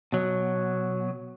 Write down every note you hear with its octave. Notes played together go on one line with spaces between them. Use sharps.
B2 F#3